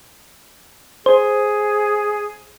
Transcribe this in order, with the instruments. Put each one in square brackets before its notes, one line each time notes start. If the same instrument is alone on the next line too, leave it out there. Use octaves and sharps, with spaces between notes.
[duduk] G#4 [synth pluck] C5